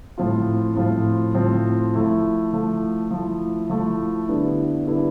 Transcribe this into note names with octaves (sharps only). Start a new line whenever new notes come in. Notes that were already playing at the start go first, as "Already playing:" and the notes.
A2 F3 C4 F4
A2 F3 C4 F4
A2 F3 C4 F4
F3 A3 E4
F3 A3 E4
F3 A3 E4
F3 A3 E4
D3 G3 B3 E4
D3 G3 B3 E4